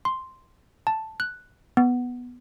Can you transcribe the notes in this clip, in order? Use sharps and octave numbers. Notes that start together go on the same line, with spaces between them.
C6
A5
F#6
B3